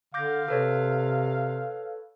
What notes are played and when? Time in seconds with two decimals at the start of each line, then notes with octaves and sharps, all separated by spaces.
0.14 D3 F5 D6 G6 A#6
0.48 C3 A4 B4 C#5